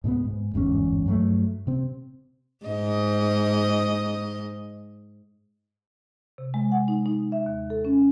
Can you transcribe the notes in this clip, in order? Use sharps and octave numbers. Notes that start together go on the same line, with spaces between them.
G#2 B2 A#3 B3
G#2
G1 E2 G#2 C#4
G2 F#3 A3
C3 C4
G#2 D#5
C3
G#3
F#5
D#4
D#4
E5
D#2
A4
C#4